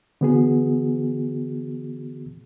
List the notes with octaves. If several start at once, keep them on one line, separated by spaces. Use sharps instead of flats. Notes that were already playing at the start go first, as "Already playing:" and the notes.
D3 E3 B3 F#4 G#4